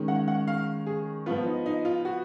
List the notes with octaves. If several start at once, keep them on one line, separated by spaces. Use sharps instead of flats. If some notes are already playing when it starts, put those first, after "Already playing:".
Already playing: D#3 G#3 C#4
F#5
F#5
F5
G#4
F3 B3 F4
D#4
D#4
F4
F#4